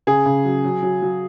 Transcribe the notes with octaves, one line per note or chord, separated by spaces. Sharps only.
C#3 G#4
C#3
F#3
F#3
F#3
F#3